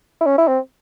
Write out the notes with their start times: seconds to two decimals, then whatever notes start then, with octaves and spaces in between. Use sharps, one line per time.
0.21 E4
0.26 C#4
0.38 E4
0.48 C4